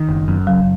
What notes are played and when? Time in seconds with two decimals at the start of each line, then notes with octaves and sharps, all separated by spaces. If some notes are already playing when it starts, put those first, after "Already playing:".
Already playing: D#3
0.09 F#1
0.28 F#2
0.47 F#1 F#3